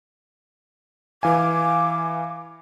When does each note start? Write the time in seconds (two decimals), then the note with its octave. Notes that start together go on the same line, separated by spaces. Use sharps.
1.23 E3 F5 G#5 D6